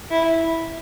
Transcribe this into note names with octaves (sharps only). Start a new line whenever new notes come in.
E4